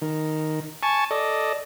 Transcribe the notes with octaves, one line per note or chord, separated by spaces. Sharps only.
D#3
G#5 A5 C#6
A4 D5 D#5